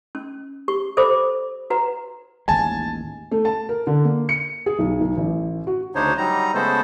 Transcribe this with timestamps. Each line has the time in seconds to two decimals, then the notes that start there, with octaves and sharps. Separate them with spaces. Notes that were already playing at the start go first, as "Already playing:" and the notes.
0.15 C#4
0.68 G4 C#6
0.97 A4 C5 D5 E5 B5 D6
1.70 F#4 B4 F#5 A#5
2.48 A1 D#2 G#3 G#5 A5
3.31 A3
3.45 A5
3.69 A#4
3.87 D3
4.05 A#3
4.29 C#7
4.66 G#4
4.79 B1
5.00 B1
5.17 A1
5.67 F#4
5.95 D2 C#3 D4 D#4 C5 C#5
6.18 F#3 G3 D#4 A#5
6.54 C#3 G#3 A3 B3 A4 C5